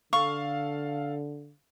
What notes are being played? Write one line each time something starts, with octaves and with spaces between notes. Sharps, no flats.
D3 A4 F5 C#6